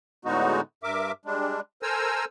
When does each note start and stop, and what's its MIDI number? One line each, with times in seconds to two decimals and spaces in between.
0.25 0.61 45
0.25 0.61 50
0.25 0.61 56
0.25 0.61 59
0.25 0.61 63
0.25 0.61 66
0.83 1.12 43
0.83 1.12 70
0.83 1.12 76
0.83 1.12 86
1.25 1.60 55
1.25 1.60 56
1.25 1.60 62
1.83 2.25 69
1.83 2.25 70
1.83 2.25 72
1.83 2.25 80
1.83 2.25 82
1.83 2.25 88